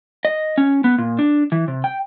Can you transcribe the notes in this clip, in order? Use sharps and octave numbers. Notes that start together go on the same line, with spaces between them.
D#5
C#4
B3
A#2
D4
E3
C3
G5